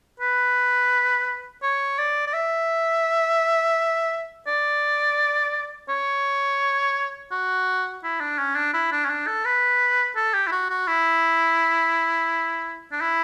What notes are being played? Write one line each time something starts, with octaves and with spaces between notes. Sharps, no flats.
B4
C#5
D5
D5
E5
D5
C#5
F#4
E4
D4
C#4
D4
E4
D4
C#4
D4
A4
B4
A4
G4
E4
F#4
F#4
E4
D4
E4